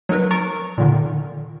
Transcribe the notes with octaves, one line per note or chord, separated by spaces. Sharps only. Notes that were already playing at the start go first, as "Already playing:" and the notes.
F#3 D#4 A#4 B4
A#5 C#6 A6 D7
A#2 D3 D#3